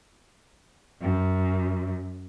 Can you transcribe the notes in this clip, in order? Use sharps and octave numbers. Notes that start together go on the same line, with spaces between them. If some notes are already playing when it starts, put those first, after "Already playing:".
F#2